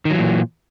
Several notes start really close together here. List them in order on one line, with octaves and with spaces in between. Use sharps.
D#3 F#3 E3 A#2